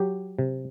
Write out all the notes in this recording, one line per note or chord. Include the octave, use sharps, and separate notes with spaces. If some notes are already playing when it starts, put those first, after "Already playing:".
Already playing: F#3 G4
C3